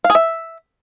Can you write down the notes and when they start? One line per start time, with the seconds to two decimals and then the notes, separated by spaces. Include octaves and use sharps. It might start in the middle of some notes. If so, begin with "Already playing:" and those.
0.04 F5
0.10 G#4
0.15 E5